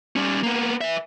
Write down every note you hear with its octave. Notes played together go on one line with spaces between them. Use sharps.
G3 C#4
A#3 B3
B4 E5